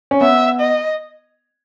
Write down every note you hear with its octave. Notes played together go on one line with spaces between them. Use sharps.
C#4
B3 E5
D#5